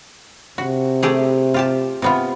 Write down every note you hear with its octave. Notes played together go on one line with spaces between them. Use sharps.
C3 F#4
A3 G4 G#4
F4 G4 A5
C3 B3 F4